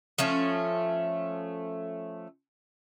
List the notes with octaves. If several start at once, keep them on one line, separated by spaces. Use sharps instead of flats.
F3 A3 C#4